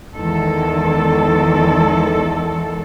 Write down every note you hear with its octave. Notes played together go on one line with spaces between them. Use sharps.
E2 D#3 G#3 A4